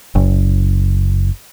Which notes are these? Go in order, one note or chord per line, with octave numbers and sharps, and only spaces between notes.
F#1